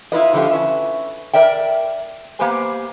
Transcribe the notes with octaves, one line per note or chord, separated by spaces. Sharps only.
E4 F4 B4 D#5
D3 F3 A3 F4 G4
C#4 B4 E5
A#4 D5 E5 G5
A#3 B3 G4 B4 C5 G#5